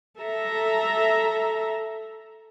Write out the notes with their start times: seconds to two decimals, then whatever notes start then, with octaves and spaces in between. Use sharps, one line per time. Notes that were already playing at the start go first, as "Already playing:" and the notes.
0.20 A4 E5 A#5